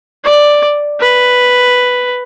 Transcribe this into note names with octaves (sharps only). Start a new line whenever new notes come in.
D5
B4